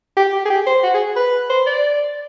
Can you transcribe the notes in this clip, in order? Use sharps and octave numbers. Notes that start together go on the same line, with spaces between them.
G4
G4
G#4
G4
C5
F#4
G#4
B4
C5
D5